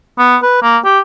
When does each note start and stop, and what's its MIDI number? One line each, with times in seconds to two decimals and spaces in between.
0.18 0.37 59
0.42 0.59 71
0.63 0.78 58
0.85 1.00 67